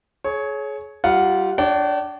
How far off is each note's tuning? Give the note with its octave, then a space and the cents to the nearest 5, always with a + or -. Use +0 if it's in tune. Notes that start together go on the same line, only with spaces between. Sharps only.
G#4 +35 C#5 +0
G3 -25 F4 +0 F#5 +0
D4 +0 C#5 +30 G5 -45